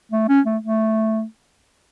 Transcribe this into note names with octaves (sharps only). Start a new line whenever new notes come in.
A3
C#4
A3
A3